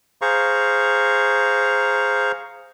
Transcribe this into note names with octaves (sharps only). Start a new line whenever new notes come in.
G#4 C5 F5 A#5 C#6